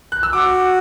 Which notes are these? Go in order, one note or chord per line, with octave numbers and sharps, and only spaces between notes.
F#6
E6
F#4 D6